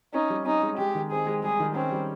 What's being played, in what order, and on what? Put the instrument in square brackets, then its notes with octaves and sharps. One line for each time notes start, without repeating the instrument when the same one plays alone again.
[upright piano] C#4 [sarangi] D#4
[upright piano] G3
[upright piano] C#4 [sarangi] D#4
[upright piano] G#3
[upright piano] G#3 [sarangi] G4
[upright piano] D#3
[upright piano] C4 [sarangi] G#4
[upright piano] G#3
[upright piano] G3 [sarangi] G#4
[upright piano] D#3
[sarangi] C4 [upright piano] C#4
[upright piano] G3